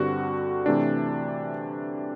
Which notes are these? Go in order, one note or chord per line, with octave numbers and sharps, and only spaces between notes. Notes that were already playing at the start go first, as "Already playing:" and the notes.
Already playing: G2 D3 G3 C4 F#4
C3 E3 A3 D4